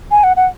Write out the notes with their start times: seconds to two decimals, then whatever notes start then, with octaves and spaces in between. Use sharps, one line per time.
0.11 G#5
0.24 F#5
0.37 F#5